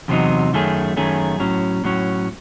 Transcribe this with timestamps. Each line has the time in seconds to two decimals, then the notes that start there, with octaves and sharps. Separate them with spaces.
0.08 E2 C3 F#3 C4 D#4
0.53 F#2 D#3 A3 C#4 G#4
0.97 F#2 D#3 A3 C#4 G#4
1.40 A2 F#3 C#4
1.84 A2 F#3 C#4